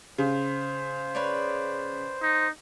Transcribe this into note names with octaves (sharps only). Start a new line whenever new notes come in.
C#3 C5
B4 C#5 D5
D#4